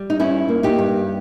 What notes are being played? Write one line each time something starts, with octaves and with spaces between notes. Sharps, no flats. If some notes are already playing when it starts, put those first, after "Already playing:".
Already playing: G3
D#4
G2 C#4 E4
A#3
D#4 G4
G2